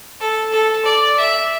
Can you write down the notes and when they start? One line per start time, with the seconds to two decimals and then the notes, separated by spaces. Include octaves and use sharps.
0.20 A4
0.52 A4
0.84 D5
1.17 E5